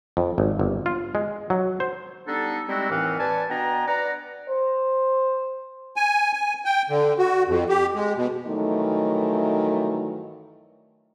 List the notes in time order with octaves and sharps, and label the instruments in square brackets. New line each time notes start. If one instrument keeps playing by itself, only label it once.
[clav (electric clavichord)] F2
G#1
G1
F4
G#3
F#3
C5
[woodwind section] G3 B3 D4 D#4 A4
G3 G#3 C4 D#4 E4 F#4
D#2 A2 E3 C4 F5 F#5
B4 D5 G#5 A5
B2 B3 D4 G5 G#5 A#5
B4 D5 F#5 A#5
[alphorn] C5
[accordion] G#5
G#5
G5
D3
F#4
F2
G4
G#3
B2
[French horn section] G2 D#3 E3 F#3 A3